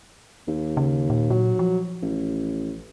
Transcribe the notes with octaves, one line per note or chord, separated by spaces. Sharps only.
D#2
C#3
A#2
A#2 F#3
F3
A1